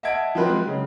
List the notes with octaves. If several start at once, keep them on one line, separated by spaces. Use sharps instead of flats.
D#5 E5 F#5 A5 G#6 D7
F3 F#3 C4 B4
G#3
C#3 F#3